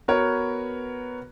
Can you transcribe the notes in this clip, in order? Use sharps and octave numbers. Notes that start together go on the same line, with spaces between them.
B3 F#4 A#4 B4 C#5